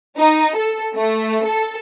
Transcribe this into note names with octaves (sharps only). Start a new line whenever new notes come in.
D#4
A4
A3
A4